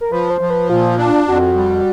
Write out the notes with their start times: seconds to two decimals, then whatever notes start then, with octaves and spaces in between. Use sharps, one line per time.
0.01 A#4
0.12 F3 B4
0.30 C5
0.41 F3
0.50 B4
0.70 A#2 F4
0.98 D4
1.27 F2 F#4
1.56 G3